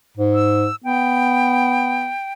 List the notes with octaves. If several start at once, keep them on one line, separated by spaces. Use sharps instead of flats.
G#2
E6
B3 G5